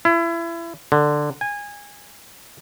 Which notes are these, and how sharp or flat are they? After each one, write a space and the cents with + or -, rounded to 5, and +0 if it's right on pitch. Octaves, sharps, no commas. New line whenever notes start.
E4 +30
D3 +10
G#5 -20